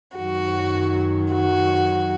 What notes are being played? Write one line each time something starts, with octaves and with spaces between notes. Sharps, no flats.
F#2 D#3 F#3 F#4
F#4